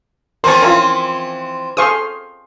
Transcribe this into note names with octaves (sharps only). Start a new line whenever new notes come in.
E3 F3 C4 A#4 C5 C#5 A5 C6
C#4 E4 F4 A#4
G#4 A4 C5 F5 C#6 D#6